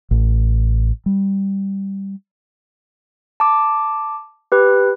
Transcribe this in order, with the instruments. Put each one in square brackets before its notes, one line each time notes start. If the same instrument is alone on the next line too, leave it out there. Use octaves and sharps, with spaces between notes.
[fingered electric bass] A1
G3
[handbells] A5 D6
G4 B4